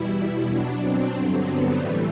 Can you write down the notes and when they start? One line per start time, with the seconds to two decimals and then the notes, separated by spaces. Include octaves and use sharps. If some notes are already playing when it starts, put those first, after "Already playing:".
Already playing: E2 B2 G3 E4
0.48 B2 F#3 D4
0.81 C4
1.13 G2 D3 F#3
1.46 B3
1.78 A2 E3 G3 A3